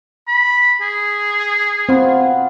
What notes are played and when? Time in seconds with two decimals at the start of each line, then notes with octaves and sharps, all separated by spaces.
0.28 B5
0.81 G#4
1.89 B3 C4 F4 F#4